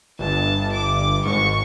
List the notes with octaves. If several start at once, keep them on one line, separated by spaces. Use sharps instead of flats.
G1 G2 A5
D6
G#1 G#2 C#6